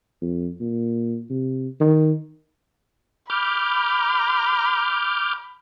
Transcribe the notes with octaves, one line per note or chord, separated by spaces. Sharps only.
F2
A#2
C3
D#3
B5 D6 F6 G6